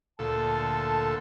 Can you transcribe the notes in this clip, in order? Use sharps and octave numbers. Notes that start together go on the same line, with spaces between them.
D2 A#2 A4 A5